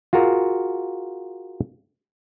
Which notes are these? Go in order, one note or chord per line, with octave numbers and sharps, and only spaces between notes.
F4 F#4 G#4 A#4